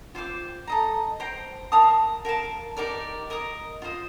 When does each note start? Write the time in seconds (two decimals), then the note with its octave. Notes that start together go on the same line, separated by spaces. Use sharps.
0.15 F4 C5 G5 D6
0.67 A4 D#5 A#5
1.20 C5 G5 A#5
1.72 A#4 F5 A5 D#6
2.25 A#4 F5 A5
2.77 D#4 G4 A#4 D5
3.30 A#4 D#5 A#5 D#6
3.82 F4 C5 D#5